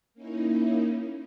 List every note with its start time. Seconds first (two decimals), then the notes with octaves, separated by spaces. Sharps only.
0.14 A#3 C#4 D#4 E4